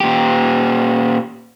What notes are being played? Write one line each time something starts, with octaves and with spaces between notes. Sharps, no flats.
A#2 G4